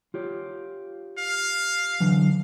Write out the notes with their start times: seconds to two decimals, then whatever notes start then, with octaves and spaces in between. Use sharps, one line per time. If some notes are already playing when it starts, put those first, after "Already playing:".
0.14 F4 G4 C#5
1.18 F5
2.00 D3 E3 F#3